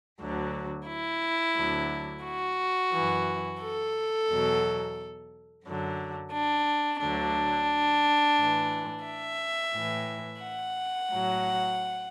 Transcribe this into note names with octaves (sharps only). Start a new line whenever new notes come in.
D2 D3 F#3
E4
D2 D3 F#3
F#4
F#2 E3
A4
E2 B2 F#3
F#2 D3 F#3
D4
D2 D3 F#3 D4
A2 E3
E5
A2 E3
F#5
A2 F#3